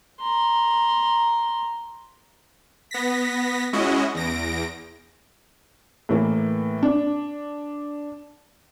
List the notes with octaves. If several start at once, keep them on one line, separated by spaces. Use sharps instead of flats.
A#5 C6
B3 A#6 B6
G#3 C#4 E4 F#4 D#5
E2 A#6 D7
A2 E3 A#3
D4